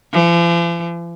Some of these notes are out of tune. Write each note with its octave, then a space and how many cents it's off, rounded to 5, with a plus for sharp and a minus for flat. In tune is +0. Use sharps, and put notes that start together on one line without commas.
F3 -45